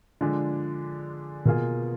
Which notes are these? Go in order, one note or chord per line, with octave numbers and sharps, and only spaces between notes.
D3 F3 G#3 D4
B2 A#3 F4 G#4